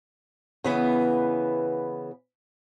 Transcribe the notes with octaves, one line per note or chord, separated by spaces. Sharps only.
C#3 E3 B3